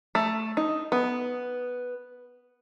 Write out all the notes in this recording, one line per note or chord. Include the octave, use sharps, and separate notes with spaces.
A3
D#4
B3